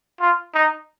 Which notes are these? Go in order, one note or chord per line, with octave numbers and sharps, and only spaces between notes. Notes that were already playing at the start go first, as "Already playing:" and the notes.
F4
D#4